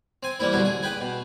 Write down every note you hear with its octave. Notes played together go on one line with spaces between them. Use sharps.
C4 G#5
E3 G3 A#3 E4
B2 D3 F#3 G3 E4
G#4
G#4 B4 G5
B2